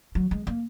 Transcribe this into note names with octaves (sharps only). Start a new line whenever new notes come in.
F#3
G#3
A#3